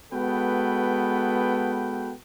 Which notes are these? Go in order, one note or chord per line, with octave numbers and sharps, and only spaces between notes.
G#3 B3 F#4 A4 B4 G5